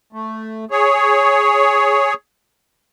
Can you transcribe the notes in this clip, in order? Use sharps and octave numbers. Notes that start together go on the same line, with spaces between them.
A3
G#4 C#5